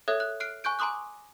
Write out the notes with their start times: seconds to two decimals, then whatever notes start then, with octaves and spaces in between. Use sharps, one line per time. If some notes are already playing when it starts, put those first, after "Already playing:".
0.08 A4 C#5 E5 D#6 F#6 G#6
0.20 F#6
0.40 F6 F#6 C7 D7
0.64 G#5 C#6 F#6 G6 D7
0.79 G#5 A#5 C6 D6 D#6 F#6